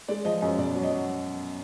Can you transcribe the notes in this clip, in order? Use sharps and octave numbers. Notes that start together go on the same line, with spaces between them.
G#3 D5
F3 D#5
F#2 D#5
B2 D5
F#3
D#5
F#3